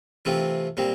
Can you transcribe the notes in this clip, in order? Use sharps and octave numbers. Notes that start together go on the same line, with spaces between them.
C3 E3 A3 C4 F4
A#2 G3 C4